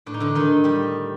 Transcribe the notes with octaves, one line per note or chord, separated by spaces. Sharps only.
A2 D4
D#4
D3 D4
D#3 D#4
A2
G3 G4